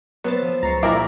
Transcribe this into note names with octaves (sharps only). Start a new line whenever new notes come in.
F#3 B3 C5 E5 A6
F3 E6
C#2 G#3 C#5 A#5 A6 C7
A#2 F#3 A#3 E4 A#4 A#5 D6